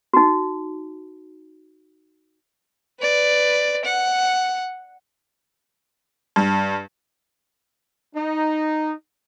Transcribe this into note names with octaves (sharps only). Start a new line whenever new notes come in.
D#4 F#4
B4 D5
F#5
G2
D#4